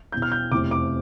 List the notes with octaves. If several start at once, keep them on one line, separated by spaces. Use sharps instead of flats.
E2 B2 G6
F6
G6
F1 E2 C3 D6
D6